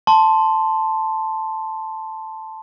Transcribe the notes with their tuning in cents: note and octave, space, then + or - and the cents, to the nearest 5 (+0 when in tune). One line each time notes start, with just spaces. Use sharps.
A5 +0 C6 +0